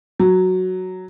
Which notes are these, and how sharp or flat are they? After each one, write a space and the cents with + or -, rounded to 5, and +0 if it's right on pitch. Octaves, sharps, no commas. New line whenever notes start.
F#3 +0